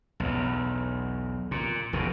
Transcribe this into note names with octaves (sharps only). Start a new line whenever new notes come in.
B1 E2
A#2
F1 D#2 B2